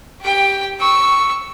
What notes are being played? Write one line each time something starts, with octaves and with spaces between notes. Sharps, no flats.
G4 G5
C#6 E6